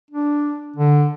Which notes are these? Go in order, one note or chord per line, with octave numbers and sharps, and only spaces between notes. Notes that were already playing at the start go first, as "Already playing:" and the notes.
D4
D3